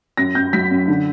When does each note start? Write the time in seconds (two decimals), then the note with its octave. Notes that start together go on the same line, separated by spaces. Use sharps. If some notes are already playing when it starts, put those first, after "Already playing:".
0.17 F#2 A#6
0.35 F#2 G6
0.53 F#3 B6
0.71 F#2
0.88 D3